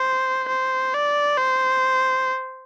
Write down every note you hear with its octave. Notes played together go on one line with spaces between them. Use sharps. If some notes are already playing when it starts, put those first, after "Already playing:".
Already playing: C5
C5
D5
C5